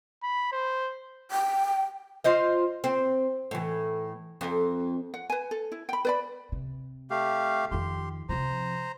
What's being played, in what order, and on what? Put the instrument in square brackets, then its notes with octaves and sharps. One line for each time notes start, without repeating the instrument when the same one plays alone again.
[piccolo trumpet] B5
C5
[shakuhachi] G5
[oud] F4 C5 D#5
C4
A2 E3
F2
[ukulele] F#5
B4 G#5
A4
E4
G5 B5
B4 D5 B5
[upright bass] C3
[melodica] A3 G4 F5
[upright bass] F2 D#3 [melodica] G4 C6
[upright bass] C3 F3 [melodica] C5 A#5